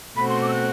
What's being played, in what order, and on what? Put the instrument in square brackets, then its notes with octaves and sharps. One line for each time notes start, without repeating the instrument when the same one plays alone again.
[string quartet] B2 A3 C4 F#4 [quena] B5
[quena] C6
D6
E6
F#6